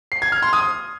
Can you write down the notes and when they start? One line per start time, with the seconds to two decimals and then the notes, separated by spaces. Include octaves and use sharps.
0.12 C7
0.22 G#6
0.32 F6
0.43 C6
0.53 D#6